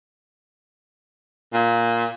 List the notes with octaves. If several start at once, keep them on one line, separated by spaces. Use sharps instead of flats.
A#2